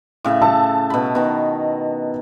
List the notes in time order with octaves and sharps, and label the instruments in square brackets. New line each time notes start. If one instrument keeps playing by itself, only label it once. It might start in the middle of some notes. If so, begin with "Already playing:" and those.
[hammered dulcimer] A2 C#3 E5
[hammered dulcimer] A4 [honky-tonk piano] A5 E6
[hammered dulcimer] B2 B5
B2 D#3